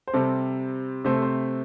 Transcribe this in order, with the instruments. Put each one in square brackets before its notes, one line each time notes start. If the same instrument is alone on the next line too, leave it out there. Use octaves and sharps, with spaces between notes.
[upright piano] C5
C3 G3 C4 A4
C3 A3 C4 C5
A4
C5